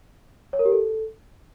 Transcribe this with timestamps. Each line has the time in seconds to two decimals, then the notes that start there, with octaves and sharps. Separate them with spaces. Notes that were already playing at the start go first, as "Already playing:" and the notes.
0.53 C#5
0.59 A#4
0.65 G4
0.71 A4